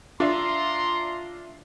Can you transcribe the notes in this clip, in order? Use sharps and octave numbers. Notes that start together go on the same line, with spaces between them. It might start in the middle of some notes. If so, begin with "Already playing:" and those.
D4 F4 D5 E5 A#5 C6